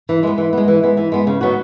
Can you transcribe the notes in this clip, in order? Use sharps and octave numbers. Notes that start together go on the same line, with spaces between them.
E3
G#3 B3
E3
G#3 B3
E3
G#3 B3
E3
G#3 B3
C#3
F#3 B3 D#4 F#4